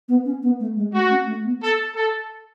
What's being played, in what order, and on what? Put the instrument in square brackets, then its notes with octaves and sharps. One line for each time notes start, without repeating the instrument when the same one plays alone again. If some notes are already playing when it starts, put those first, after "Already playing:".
[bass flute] B3
C#4
B3
A3
G#3
[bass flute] A3 [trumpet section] F#4
[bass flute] C#4
A3
B3
[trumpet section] A4
A4